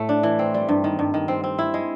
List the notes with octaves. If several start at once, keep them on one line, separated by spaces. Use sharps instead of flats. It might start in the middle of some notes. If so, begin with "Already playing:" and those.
Already playing: A2 A3
D4
E3
C4
G3
G2
D#3
G2
D#3
C4
C4
E4
G#3